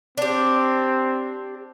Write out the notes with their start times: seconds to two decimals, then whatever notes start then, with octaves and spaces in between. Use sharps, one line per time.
0.18 C4 D4 G4